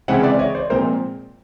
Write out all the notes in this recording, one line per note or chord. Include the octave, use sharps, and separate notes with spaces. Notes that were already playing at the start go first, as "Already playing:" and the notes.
C#3 E3 G#3 C4 E5 F#5
D5 E5
D5
C#5 D#5
C5 D5
A#2 F3 G#3 C4 A#4 C5